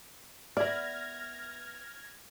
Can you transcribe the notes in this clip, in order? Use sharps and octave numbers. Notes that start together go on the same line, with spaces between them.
B3 D5 E5 F6 G#6 A#6